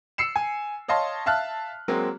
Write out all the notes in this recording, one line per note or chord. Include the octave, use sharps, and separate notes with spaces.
E6 C7 C#7 E7
G#5
C#5 D#5 F5 A5 C6
E5 F5 A5 F6 F#6
F#3 G#3 A#3 C4